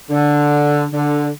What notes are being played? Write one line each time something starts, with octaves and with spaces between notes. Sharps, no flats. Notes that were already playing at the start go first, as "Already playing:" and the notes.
D3
D3